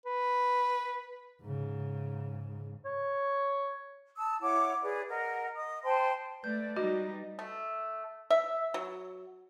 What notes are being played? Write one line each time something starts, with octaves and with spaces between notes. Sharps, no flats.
B4
G#2 C#3
C#5
A5 D#6 E6
E4 C#5 F#5 D6
G#4 B4 D5
A#4 D#5 F#5
D#5 D#6
C5 G5 A5 C6
A3 B4 D5 G6
G3 D#4 F#4 D#5
A3
E5
F#3